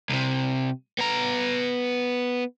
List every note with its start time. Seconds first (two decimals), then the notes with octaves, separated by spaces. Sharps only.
0.10 C2 C3
0.99 B3 A#5